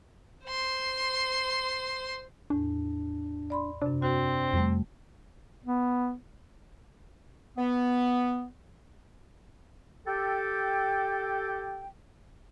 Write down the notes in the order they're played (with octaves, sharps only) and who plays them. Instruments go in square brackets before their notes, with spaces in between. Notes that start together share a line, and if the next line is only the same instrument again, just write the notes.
[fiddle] C5 C6
[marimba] E2 A2 [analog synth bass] D4
[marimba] D5 B5 C6
[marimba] F#2 C3 [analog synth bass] D4
[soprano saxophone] C4 [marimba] F#4 C5
[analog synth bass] F2 [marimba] G3 A3
[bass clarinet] B3
[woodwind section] B3
G4 A4 G5